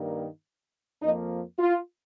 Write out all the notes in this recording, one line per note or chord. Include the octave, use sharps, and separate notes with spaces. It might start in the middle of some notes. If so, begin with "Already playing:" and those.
Already playing: G2 D#3 G3 A#3
F2 F3 A#3 D#4
F4